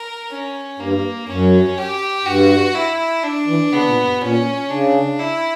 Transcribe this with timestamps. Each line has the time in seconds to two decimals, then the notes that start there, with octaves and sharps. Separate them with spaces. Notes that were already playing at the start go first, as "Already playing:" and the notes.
Already playing: A#4
0.31 C#4
0.79 G2 A#3
1.28 F#2 C#4
1.78 G4
2.25 G2 F#4
2.75 E4
3.24 D4
3.47 E3
3.73 C#3 B3
3.88 A#2
4.05 G2
4.21 A#2 C#4
4.69 C#3 D4
5.19 E4